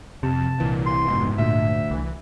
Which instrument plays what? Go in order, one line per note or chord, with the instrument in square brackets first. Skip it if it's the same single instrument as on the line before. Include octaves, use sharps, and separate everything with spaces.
[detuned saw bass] F2 [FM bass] C3 [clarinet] A5
[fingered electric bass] C2 E3 [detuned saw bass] A#2
[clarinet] C6
[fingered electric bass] F1 B2 [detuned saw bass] G#2
[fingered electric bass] D2 [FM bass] A#2 [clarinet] E5
[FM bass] C2 [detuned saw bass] E3